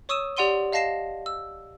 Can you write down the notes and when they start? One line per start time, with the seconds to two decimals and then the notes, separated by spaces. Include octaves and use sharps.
0.09 C#5 C#6 D#6 E6 D#7 E7
0.37 G4 D5 F#5 C6 D#7 G7
0.72 D#5 F5 A5 A#6 C7 E7
1.26 E6